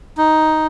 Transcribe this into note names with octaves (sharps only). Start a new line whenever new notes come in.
D#4